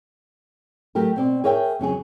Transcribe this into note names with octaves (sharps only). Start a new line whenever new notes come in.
F#3 A3 G4 A#4
B2 C4 D5
G#4 A#4 C#5 E5 G5
F2 C#3 F#3 G#4